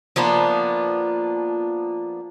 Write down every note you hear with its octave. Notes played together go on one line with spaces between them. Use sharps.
F3 A#3 B3 D4